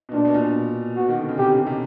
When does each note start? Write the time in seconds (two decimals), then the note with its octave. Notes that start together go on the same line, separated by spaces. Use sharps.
0.09 B2
0.13 A#2 D4
0.24 B2
0.34 A#2
0.44 B2
0.97 B2 F#4
1.09 D#3
1.19 D3
1.29 C#3
1.38 C3 G4
1.52 C#3
1.67 C3